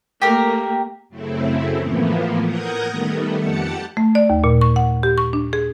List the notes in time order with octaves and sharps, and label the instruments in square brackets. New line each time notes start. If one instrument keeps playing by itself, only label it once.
[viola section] A3 A#3 [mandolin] G4 A#4
[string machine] F#2 C#3 A3 C4 E4
A2 E3 F3 A#3 B3
A#4 F#5 D#6 G6 G#6 A#6
D#3 G3 A3 B3
F2 G4 F#5 A5 C#7
[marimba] A3
D5
D#2
A#2
C#6
F#5
G4
C#6
D4
G#4